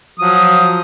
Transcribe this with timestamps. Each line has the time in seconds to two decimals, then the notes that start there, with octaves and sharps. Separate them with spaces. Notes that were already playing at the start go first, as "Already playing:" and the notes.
0.20 F3 F#3 D#6